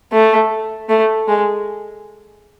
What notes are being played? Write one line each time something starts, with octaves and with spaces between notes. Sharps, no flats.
A3
A3
G#3